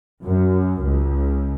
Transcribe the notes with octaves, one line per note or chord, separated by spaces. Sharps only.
F#2
C#2